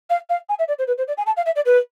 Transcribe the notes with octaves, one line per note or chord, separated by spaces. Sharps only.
F5
F5
G#5
E5
D5
C5
B4
C5
D5
G#5
A5
F5
E5
D5
B4